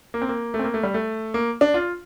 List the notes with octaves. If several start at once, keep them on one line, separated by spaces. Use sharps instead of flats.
A#3
C4
A#3
A3
C4
A#3
A3
G3
A3
A#3
D4
F4